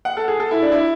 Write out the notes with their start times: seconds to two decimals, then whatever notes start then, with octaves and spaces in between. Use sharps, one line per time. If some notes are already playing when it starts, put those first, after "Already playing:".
0.05 F#5
0.17 A4
0.28 G#4
0.40 A4
0.51 E4
0.63 D4
0.72 E4